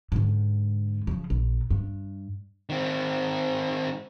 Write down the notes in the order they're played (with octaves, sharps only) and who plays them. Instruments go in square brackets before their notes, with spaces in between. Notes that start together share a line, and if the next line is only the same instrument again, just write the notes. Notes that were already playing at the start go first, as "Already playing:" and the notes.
[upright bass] G#2 D3
C#3 F3
A#1
G2
[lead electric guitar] D#3 C4